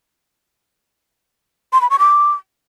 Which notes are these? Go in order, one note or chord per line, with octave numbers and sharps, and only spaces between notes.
C6
B5
C#6
D6